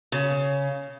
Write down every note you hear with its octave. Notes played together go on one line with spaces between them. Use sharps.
C#3